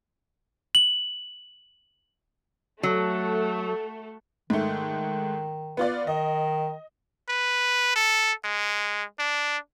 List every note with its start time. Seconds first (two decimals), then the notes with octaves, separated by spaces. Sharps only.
0.75 F#7
2.83 F#3 A3 A4
4.50 G#2 D#3 A3
5.77 B3 F4 D5
6.07 D#3 D#5
7.29 B4
7.96 A4
8.45 G#3
9.19 D4